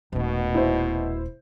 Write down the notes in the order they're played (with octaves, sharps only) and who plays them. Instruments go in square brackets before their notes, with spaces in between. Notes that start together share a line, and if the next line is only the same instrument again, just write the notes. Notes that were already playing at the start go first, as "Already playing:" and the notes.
[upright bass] D#1 A3 [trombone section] B2
[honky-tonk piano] E4 C5